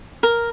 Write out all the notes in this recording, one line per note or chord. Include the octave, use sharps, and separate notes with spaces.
A#4